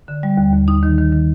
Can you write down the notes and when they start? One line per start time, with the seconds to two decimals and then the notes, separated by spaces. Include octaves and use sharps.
0.08 D3
0.23 G3
0.37 D#2
0.53 D#2
0.68 D#4
0.83 D#3
0.98 D#3
1.12 D#3